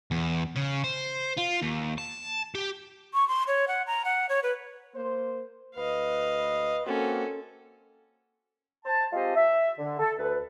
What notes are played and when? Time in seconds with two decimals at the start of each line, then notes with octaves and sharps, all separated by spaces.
0.11 E2
0.56 C#3
0.84 C5
1.38 F4
1.62 D#2
1.98 A5
2.55 G4
3.14 C#6
3.28 C6
3.47 C#5
3.68 F#5
3.87 A#5
4.05 F#5
4.29 C#5
4.43 B4
4.95 A#3 C5
5.76 D2 B4 D#5 F5
6.86 A#3 C4 C#4 F#4 A4
8.86 C5 A5
9.13 G#3 C4 F4 G4 C5 D#5
9.36 E5
9.79 D3
9.99 A4
10.19 D2 B4